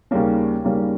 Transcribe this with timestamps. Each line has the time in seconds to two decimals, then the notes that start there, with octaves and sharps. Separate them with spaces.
0.11 D#2 C#3 G3 A#3 C#4
0.64 D#2 C#3 G3 A#3 C#4